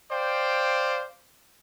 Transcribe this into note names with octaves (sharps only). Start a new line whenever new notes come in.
C5 D5 F5 G5